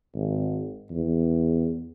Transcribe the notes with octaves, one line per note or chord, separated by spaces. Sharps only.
G#1
E2